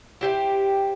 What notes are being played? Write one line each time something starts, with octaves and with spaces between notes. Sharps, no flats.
E4 G4 C5